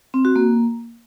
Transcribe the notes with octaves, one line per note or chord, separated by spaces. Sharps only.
C4
F#4
A#3